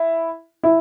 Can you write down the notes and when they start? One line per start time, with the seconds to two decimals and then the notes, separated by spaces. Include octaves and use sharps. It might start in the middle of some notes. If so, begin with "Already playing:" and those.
Already playing: E4
0.63 E4